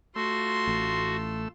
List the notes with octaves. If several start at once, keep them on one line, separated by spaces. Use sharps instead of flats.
A3 F4 F#4 C6 E6
A1